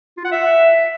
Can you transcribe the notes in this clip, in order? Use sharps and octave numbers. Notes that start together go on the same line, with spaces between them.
F4
F#5
E5